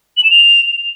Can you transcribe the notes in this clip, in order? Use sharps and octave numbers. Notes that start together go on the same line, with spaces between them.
F#7
E7
F7